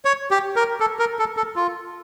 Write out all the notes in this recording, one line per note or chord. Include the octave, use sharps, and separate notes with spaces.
C#5
G4
A#4
A4
A#4
A4
A4
F4